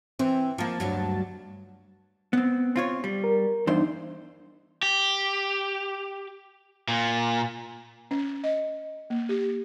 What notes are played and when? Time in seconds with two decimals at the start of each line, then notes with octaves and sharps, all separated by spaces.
0.19 E3 C4
0.58 F3 A#3 A5
0.80 D2 G2 F#3
2.33 B3 C4
2.76 C4 F4 C#5
3.04 G3
3.24 A#4
3.67 E2 G2 D4 D#4 C5
4.83 G4
6.88 A#2
8.11 C#4
8.44 D#5
9.10 A#3
9.29 G4